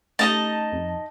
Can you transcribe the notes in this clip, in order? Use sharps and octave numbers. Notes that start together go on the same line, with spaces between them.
A3 C#4 D#4 G4 D#5 A5 D#6
F2